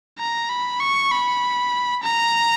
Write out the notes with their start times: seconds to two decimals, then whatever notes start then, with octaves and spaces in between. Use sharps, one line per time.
0.19 A#5
0.49 B5
0.80 C#6
1.11 B5
2.03 A#5